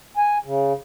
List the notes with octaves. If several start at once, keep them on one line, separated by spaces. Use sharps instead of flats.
G#5
C#3